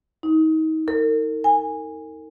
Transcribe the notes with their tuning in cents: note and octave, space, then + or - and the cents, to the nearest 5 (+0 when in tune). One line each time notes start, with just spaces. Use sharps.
D#4 +30
A#4 -40
G#5 -20